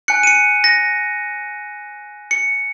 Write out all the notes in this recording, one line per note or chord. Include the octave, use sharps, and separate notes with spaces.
G#5 F#6 C#7
D#7
C#7
A#6
C#7